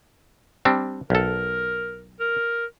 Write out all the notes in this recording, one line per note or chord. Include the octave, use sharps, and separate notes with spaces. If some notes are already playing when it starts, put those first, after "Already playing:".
G3 C4 D4
B1 A4 A#4
A#4